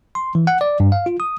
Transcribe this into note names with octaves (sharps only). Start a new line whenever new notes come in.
C6
E3
F#5
D5
G2
F5
F4
D#6